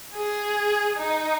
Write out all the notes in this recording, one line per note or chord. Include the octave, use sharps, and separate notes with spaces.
G#4
D#4